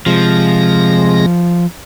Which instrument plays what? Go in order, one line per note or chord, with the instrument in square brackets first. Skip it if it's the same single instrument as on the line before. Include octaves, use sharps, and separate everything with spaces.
[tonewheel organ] C3 G#3 A#6 [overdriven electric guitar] F3